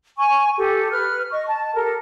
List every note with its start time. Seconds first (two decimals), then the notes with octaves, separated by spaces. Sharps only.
0.16 G#5 C#6
0.57 G4 A4
0.92 B4 F6
1.31 D#5 C#6
1.47 A5
1.74 G4 A4 A#4